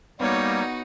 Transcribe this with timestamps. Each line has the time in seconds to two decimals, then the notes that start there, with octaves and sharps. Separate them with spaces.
0.20 G3 A#3 B3 D#4 F#4 C#5